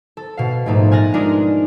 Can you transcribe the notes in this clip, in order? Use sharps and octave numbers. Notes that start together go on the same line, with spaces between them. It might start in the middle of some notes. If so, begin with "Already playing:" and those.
A4
B2 F5
A#1 G#2 A3 D#4 A4
G#5 F6 F#6 A6 A#6
G#3 D4 D#4 F4 G#4 A#4